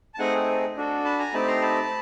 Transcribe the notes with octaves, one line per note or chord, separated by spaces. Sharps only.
A5
A3 C4 D#4 G#4 F#5 G#5
D4 F#4 A4
A5 B5
G#5 A#5
A3 C4 D#4 G4 A5 B5
A#5 C6
A5 B5